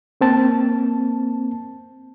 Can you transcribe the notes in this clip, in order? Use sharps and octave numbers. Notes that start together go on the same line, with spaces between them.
A#3 C4 A5